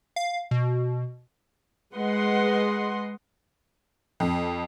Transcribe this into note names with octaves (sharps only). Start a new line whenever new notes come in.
F5
B2
G#3 B4 D#5 F#5 C6
F2